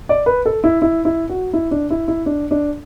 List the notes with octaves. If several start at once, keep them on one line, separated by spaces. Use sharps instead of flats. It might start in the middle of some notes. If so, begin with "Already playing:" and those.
D5
B4
A4
E4
E4
E4
F#4
E4
D4
E4
E4
D4
D4